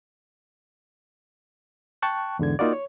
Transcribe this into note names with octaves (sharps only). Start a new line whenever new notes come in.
G5 A5 C#6 F#6
E2 G#2 D3 G#6
A#3 D#4 F4 F#4 D5
C#5